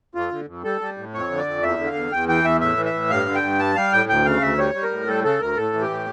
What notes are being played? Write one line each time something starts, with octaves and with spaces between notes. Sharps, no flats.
F2 F4
D3
F2
G3 A4
G3
A2
F2 C#5
D3
D5
F2
E2 E5
D3
F5
E2
E2 G5
E3 G5
E2 E5
A2 E5
E3
E5
A2
G2 F5
D3
G5
G2
G3 A5
G3 F5
A2 G5
D2 G5
C#3 F5
D2 E5
G3 C#5
G3
A#4
A2
G3 A4
C#3 A4
D2 A#4
A2 A4
E3
G4
A2